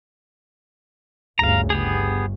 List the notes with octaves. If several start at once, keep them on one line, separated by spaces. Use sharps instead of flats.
G1 D2 C#3 F5 A#5
G1 B3 G4 G#4